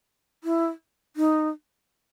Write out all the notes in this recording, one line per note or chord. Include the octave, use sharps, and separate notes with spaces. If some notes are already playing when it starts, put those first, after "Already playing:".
E4
D#4